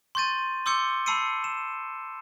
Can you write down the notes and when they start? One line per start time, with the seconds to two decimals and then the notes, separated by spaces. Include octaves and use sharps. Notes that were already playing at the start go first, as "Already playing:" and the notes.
0.15 C6 C#6 G6 A6 D#7
0.66 C6 D6 E6 G6 C#7 G7
1.06 A5 B5 E6 C7 C#7 D#7
1.44 E7